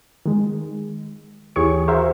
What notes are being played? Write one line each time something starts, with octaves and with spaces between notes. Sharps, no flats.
D#3 G#3
D#2 E3 G4 G#4 C#5 C#6
F#4 G#4 A#4 C5 E5 F5